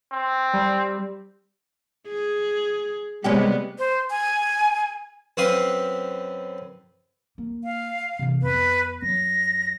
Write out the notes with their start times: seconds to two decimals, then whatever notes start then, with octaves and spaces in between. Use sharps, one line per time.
0.12 C4
0.53 G3
2.08 G#4
3.24 C3 G3 G#3 B3 C#4 G4
3.79 C5
4.11 G#5
5.37 F#2 C4 B4 F5 C6 D#6
7.38 A#3
7.64 F5
8.19 C3 E3
8.42 F2 B3 B4
9.02 F#2 F#3 A#6